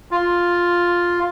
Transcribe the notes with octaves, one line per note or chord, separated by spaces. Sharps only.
F4